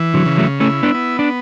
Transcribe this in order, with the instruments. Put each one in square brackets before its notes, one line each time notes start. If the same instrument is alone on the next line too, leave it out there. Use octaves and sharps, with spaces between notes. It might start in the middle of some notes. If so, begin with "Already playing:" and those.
Already playing: [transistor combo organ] E3
[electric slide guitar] D3 F#3
[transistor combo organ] C#3
[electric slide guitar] F#3 A3
[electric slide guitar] A3 C#4 [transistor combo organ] E4
[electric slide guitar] B3 D4
[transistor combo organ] B3
[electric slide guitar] D4